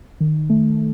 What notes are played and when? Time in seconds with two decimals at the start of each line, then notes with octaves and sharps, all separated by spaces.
0.20 D#3
0.50 A3